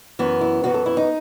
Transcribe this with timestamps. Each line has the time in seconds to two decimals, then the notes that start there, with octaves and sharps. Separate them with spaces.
0.19 F#2 E3 B3
0.41 E4
0.63 F#2 E3 B3 F#4
0.74 A4
0.86 E4
0.97 D#4